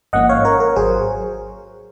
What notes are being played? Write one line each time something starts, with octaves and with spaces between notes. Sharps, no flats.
G#1 G#2 F3 A#3 C#4 D#5 F#5
C#5 F5
A#4 C#5
A#4
G#1 F#3 G#4 C5